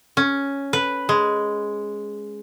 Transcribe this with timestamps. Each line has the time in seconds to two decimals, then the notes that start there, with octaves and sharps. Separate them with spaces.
0.17 C#4
0.73 B4
1.09 G#3